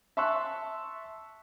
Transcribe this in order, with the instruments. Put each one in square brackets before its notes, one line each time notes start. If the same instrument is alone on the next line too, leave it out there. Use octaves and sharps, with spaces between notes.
[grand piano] E5 A5 C6 C#6 E6 F#6